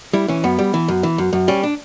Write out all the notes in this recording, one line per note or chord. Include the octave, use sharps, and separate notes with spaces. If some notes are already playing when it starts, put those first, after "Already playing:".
G3 E4
E3 C#4
F#2 B3
G3
E3
F#2
E3
F#2
F#2
G3 C#4
D4